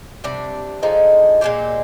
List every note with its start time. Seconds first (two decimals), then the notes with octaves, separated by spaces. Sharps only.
0.24 C3 G3 D4
0.83 D3 F3 G#3 D#4
1.41 A#2 G#3 C4 G4